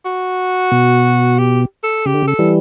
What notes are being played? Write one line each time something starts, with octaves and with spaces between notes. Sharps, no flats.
F#4
B2
G4
A4
C#3 G4
D3
C#3
A4
E3 G3